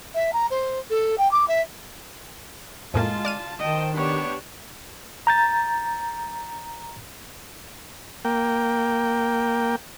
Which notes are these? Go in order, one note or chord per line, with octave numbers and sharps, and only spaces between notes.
E5
A#5
C5
A4
G5
D6
E5
F2 A2 G#3 A#3 F4 A5
D5 F6 D#7
D#3 C5 D#5 G5 A5
B3 D4 G4 C#5
A#5 G6 A6
A#3 G5